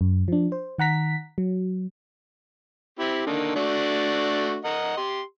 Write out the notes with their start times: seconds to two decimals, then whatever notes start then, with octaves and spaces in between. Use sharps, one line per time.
0.01 F#2
0.28 F3 D4
0.52 C5
0.78 D#3 F#5 A#5 B6
1.38 F#3
2.99 C4 E4 G4
3.26 D3 D#3 A#3
3.56 A3 D4 F#4
4.64 A#4 D#5 F#5
4.97 G4 C6